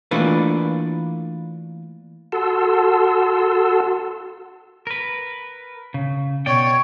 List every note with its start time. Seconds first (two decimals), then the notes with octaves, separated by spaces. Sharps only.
0.11 E3 A3 A#3 D4 F4 B4
2.32 F#4 A4 F#5 A5 C6 E6
4.87 A#4 B4
5.94 C#3
6.46 B2 C#5 D5 G5